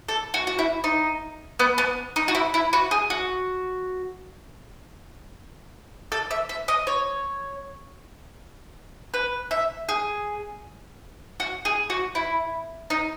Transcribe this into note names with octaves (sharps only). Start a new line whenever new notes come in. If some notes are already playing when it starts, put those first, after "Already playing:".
A4
F#4
F#4
E4
D#4
B3
B3
D#4
F#4
E4
E4
F#4
G#4
F#4
A4
E5
E5
D#5
C#5
B4
E5
G#4
F#4
G#4
F#4
E4
D#4